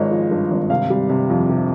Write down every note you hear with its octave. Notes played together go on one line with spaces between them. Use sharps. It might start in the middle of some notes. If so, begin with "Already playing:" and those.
Already playing: G#1 F3 G#3 C#5 D#5
F3
G2
G#1
C3 F5
G3
C3
F2
C3